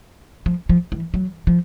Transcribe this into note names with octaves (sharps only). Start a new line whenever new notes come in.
F3
F3
E3
F#3
F3